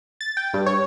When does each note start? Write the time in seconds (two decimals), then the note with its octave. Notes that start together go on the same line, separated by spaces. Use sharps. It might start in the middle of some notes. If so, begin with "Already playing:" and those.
0.21 A6
0.37 G5
0.54 G2
0.66 C#5